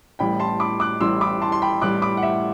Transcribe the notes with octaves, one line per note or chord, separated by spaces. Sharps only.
A1 A2 E3 G3 G5 B5
A5 C6
B5 D6
D6 F#6
A1 A2 E3 G3 C6 E6
B5 D6
A5 C6
C6
G5 B5
A1 A2 E3 G3 D6 F#6
B5 D6
F#5
E5